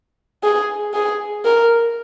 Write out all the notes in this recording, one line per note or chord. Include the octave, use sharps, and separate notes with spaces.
G#4
G#4
A#4